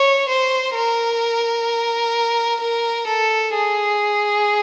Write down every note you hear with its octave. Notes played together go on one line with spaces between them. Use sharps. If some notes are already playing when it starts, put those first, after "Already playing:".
Already playing: C#5
C5
A#4
A#4
A4
G#4